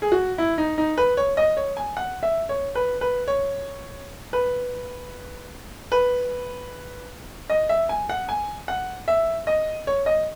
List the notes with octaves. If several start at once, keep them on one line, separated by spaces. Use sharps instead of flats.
G#4
F#4
E4
D#4
D#4
B4
C#5
D#5
C#5
G#5
F#5
E5
C#5
B4
B4
C#5
B4
B4
D#5
E5
G#5
F#5
G#5
F#5
E5
D#5
C#5
D#5